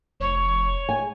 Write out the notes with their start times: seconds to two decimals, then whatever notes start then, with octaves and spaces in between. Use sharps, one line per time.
0.20 F1 C#5
0.89 G#3 G#5